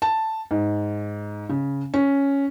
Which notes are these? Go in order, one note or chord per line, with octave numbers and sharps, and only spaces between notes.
A5
G#2
C#3
C#4